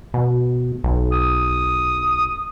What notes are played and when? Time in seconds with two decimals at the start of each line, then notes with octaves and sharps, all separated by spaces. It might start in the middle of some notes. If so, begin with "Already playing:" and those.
0.14 B2
0.84 B1
1.12 D#6